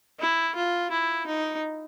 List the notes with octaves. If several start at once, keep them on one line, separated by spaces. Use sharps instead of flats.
E4
F4
E4
D#4